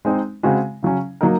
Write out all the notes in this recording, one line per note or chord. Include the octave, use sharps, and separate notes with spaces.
G#3 C4 D#4
C#3 G#3 C4 F#4
C#3 F#3 C#4
F#3 A#3 D#4 A#4